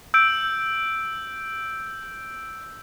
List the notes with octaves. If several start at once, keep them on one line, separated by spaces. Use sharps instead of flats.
E6 G6 D7